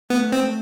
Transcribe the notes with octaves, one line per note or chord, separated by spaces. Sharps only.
A3 B3
C4
A3